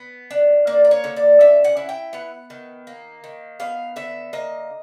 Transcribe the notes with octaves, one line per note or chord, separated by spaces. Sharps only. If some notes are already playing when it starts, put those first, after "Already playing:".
Already playing: B3
D4
A#3 D5
D5
C#5
D3
D5
C#4 E5
F#5
E4
G5
B3 F#5
D#3
A#3
D#3
B3 F5
D3 E5
A#3 D#5